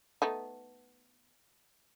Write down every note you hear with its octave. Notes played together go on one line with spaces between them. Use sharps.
A3 B3 D#4